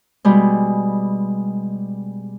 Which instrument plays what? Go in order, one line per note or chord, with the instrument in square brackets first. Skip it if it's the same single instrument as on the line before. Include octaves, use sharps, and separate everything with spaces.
[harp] B2 G3 G#3